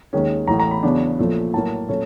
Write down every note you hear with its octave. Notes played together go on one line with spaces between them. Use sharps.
D#2 D#3 G#3 C#4
A1 A2 E3 A#5
A#5
B5
E2 C#3 F#3 B3 D4
A#1 A#2 F3 A3 C#4
A2 F#3 A#3 A5
A#2 F#3 A3 C#4